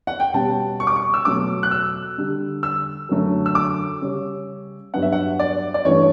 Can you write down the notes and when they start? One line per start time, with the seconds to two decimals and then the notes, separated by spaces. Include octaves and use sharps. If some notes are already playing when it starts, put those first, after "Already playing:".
0.07 F#5
0.20 G5
0.33 B2 G3 C#4 A5
0.80 C#6
0.87 D6
0.96 C#6
1.14 E6
1.25 B2 F#3 A3 D6
1.63 F#6
1.71 E6
2.18 D3 G3 D4
2.63 E6
3.09 F#2 D3 F#3 A3
3.46 E6
3.55 D6
4.01 C#3 G3 C#4
4.93 G2 F#3 B3 D4 F#5
5.02 E5
5.12 F#5
5.39 D5
5.74 D5
5.85 G2 E3 A3 C#4 C#5